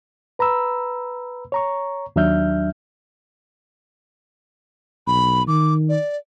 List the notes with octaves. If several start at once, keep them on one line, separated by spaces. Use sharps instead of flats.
B4 A#5 B5 E6
C#5 A#5 C#6
D#2 F#3 D4 E5 F6 G6
B1 B5
D#3 D6
D5